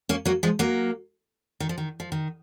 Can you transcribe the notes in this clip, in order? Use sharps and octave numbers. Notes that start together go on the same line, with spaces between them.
A#3 C#4
F#3 A#3
F3 G#3
F#3 A#3
D#3
F3
D#3
F3
D#3